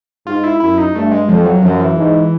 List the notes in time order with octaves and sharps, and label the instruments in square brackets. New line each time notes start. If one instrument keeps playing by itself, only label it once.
[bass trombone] G#2 [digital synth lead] F4
[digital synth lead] E4
[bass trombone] F#2 [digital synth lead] E4
[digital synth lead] D#4
[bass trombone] G2 [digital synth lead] A3
[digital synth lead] G#3
[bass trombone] F2 [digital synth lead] F3
[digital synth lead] F#3
[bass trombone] F#2 [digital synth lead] F3
[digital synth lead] E3
[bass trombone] G#2